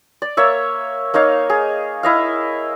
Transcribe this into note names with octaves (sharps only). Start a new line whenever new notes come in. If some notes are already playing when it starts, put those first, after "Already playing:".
D5
A#3 C#5 E5
A#3 D#4 C#5 F5
G#4
E4 D#5 F5